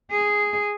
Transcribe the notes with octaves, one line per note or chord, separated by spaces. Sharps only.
G#4